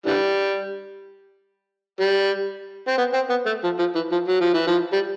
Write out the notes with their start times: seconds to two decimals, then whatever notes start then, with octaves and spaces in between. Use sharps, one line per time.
0.06 D3 E3 G3
2.00 G3
2.87 C4
2.98 B3
3.13 C4
3.30 B3
3.46 A3
3.63 F3
3.79 F3
3.95 E3
4.11 F3
4.28 F#3
4.41 F3
4.54 E3
4.67 F3
4.93 G3